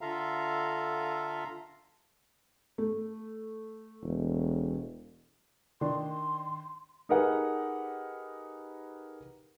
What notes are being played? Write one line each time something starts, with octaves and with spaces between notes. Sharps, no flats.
D3 F4 A4 E5 F5 A#5
A3
E1
D#3 D4 C6
D#4 G4 G#4 A#4 B4 F#5